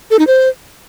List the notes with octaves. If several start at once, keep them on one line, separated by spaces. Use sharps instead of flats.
A4
D#4
C5